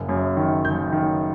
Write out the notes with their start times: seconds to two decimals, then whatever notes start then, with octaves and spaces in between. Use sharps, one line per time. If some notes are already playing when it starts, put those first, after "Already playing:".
Already playing: F#1
0.09 F#2
0.37 D#3
0.65 F#1 G6
0.92 D#3